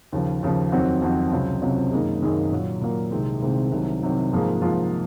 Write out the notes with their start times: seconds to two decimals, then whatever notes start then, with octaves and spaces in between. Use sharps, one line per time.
0.12 D#2 C#3 F3
0.42 D#2 C#3 F3
0.72 F2 D#3 F#3 C4 F#4
1.02 F2 D#3 F#3 C4 F#4
1.32 C#2 C3 F#3 C4
1.62 C#2 C3 F#3 C4
1.92 F#2 D#3 A#3 D#4 G#4
2.22 F#2 D#3 A#3 D#4 G#4
2.52 A#2 F#3 A#3
2.81 A#2 F#3 A#3
3.11 C2 C3 D#3 G#3 C4
3.42 C2 C3 D#3 G#3 C4
3.71 C2 C3 D#3 F#3
4.02 C2 C3 D#3 F#3
4.32 G#2 F3 A#3 F4 G#4
4.61 G#2 F3 A#3 F4 G#4